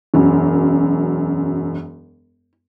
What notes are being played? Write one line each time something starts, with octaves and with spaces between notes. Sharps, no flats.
E1 F#2